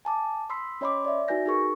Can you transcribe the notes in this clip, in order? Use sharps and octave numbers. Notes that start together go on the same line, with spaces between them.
G#5 A5 D6
B5 C6 D#6 E6 B6 C7
C#4 C#5 D#5 B5 C6 D6
D5 E5
D#4 F#4 B4 G#5 G6 A#6
D#4 G4 G#4 A#4 C#6